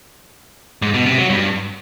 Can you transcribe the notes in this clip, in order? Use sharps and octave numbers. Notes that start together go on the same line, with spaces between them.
G#2
B2
C3
F#3
G2